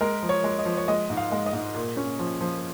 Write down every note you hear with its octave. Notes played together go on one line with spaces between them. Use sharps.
G#3 A#4
F3
C#5
G#3
D#5
F3
C#5
G#3 D#5
G#2
F5
G#3
D#5
G#2
A#2
C#4
F3
F3